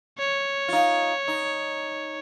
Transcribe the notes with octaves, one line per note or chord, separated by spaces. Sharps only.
C#5
D#4 F4
D#4